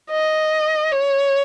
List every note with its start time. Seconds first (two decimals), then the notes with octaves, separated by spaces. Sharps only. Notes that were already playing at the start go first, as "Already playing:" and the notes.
0.11 D#5
0.92 C#5